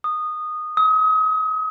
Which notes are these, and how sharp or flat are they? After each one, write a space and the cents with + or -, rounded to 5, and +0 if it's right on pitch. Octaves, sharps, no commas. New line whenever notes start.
D#6 -15
D#6 +35